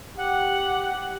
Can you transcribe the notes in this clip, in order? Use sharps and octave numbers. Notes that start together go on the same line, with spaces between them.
G4 F#5